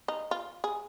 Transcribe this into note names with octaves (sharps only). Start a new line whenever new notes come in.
D#4
F4
G#4